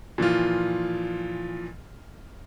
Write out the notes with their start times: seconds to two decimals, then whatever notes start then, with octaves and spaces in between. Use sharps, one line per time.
0.18 A#2 E3 F3 F4